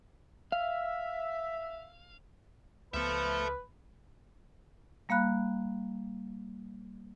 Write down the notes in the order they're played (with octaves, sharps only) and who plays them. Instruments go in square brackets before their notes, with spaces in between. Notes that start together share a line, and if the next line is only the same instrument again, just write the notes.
[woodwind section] E5 [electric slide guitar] F5
[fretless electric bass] C#2 B3 [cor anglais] F3 [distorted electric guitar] A4 E5 [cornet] B4
[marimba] G3 A#3 F5 B5 F#6